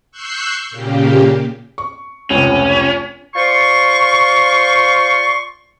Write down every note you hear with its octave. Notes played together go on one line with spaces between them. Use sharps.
C#6 E6 F#6 G6 C7
A#2 C#3 A#3 G4
C#6
F1 C#2 C#4
F4 C5 D5 C6 C#6